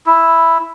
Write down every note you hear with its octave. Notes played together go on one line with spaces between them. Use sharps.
E4